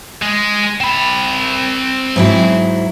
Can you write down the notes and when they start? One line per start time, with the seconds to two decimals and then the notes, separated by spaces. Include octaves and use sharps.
0.22 G#3
0.81 C4 B5
2.16 G#2 F#3 E4